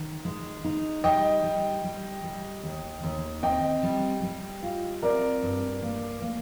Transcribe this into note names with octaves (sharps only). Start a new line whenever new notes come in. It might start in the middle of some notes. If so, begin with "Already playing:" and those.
Already playing: D#3
G#3
D#4
G3 D#5 G5
G3
G3
G3
D#2
D#2
C4 D#5 G5
G3
G3
F4
C4 A#4 D5
G2
A#3
A#3